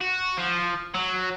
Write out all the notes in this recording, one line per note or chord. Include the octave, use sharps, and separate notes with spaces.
F#4
F3
F#3